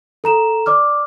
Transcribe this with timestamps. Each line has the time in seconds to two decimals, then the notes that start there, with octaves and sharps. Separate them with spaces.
0.24 A4 A#5 E7
0.66 D5 D6 F6